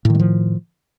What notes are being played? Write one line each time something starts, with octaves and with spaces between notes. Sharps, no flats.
A2 D#3 F3 G#3